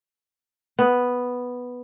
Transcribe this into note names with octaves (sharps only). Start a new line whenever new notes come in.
B3